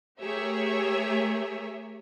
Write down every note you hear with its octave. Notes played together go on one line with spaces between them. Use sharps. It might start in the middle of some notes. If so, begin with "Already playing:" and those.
A3 G4 G#4 A#4 C#5 E5